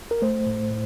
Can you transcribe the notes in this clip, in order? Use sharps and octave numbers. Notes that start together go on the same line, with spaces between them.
A#4
A3 C5
A2
A2